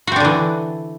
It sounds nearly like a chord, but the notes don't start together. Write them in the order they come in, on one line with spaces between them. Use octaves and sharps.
F#4 C4 D4 D3 E3